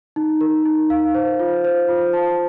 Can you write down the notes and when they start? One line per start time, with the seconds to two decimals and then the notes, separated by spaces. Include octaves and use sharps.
0.16 D#4
0.41 A#4
0.66 D#4
0.90 F5
1.14 C5
1.40 F4
1.65 C5
1.89 F4
2.13 A5